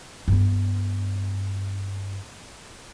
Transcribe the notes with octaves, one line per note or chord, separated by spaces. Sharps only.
G2 B3